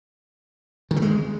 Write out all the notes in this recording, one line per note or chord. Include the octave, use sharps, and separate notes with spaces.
D#3
A3
G#3